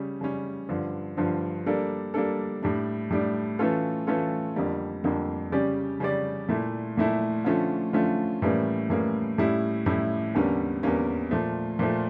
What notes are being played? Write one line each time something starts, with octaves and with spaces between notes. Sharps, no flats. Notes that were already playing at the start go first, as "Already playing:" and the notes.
Already playing: C#3 G3 C#4
C#3 G3 C#4
G2 D3 F3
G2 D3 F3
G3 A#3 D4 A4
G3 A#3 D4 A4
A2 G3 D4
A2 G3 D4
E3 A3 C#4 F4 A4
E3 A3 C#4 F4 A4
F2 D3 G3 A#3
F2 D3 G3 A#3
C#3 G3 C#4 G4 D5
C#3 G3 C#4 G4 D5
A#2 A3 E4
A#2 A3 E4
D3 F3 A3 C#4 F4
D3 F3 A3 C#4 F4
A2 E3 G3 A#3 C#4
A2 E3 G3 A#3 C#4
A2 G3 C#4 E4 G4
A2 G3 C#4 E4 G4
E2 D3 G3 A#3 C#4
E2 D3 G3 A#3 C#4
A#2 F3 A3
A#2 F3 A3